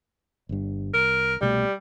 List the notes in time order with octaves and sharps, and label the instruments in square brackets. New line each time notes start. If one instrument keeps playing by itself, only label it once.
[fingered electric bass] G1 G2
[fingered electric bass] C2 [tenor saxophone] A#4
[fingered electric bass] C2 B2 A3 [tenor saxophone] G3